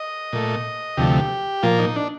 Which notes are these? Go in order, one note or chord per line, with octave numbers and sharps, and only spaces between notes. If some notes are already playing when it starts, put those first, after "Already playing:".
Already playing: D#5
A#2 A3
D2 C3 F3 A3 G4
A#2 F3 A#3 F4
D#4
D4